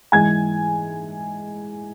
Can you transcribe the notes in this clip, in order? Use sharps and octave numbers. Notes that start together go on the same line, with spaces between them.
G#2 E3 G#3 G#5 G#6